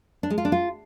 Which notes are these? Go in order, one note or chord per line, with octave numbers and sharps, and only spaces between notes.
D4
G#3
F4
D4
F4